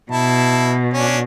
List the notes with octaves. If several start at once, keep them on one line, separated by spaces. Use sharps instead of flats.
B2 E4 A5
C#4 D4